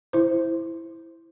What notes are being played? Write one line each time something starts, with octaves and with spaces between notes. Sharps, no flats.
E4 C5